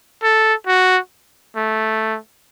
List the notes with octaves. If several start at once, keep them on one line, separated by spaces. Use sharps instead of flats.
A4
F#4
A3